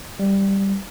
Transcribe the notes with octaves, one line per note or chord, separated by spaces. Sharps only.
G3